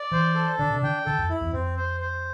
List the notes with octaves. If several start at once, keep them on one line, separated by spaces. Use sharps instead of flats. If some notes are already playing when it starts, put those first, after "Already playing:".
Already playing: D5
E3 C5
A4
D3 D4
C3
D3 G5
D3 A4
F2
E4
E2
F2 C4
C5
C5